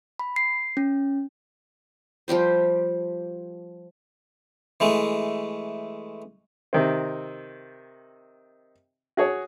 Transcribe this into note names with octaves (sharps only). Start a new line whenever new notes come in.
B5
C7
C#4
F3 G3 G4 C5
E3 G#3 A3
C3 D#3 C4
F#4 G#4 C#5